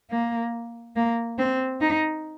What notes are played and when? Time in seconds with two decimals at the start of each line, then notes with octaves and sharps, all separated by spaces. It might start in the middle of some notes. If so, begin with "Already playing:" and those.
0.11 A#3
0.96 A#3
1.39 C4
1.81 D#4